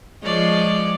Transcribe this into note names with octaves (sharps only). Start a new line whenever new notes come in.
F3 G#3 C#5 D5